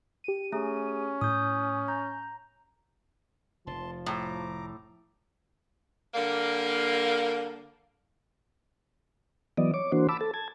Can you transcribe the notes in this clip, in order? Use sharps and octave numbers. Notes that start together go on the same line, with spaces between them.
G4 D#7
A3 C#4 G#4
A2 D#6 G6
A#5 G6
F1 F3 A5 C6
A2 A#5 D6
D3 G3 A#3
E3 F#3 B3 D5 D#5
C#5 D6
E3 A#3 D4 F#4 C5
A5 B5 D6 E6
A4 A5
A5 G#6